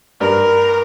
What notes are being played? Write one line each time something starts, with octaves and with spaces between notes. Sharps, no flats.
G2 A#4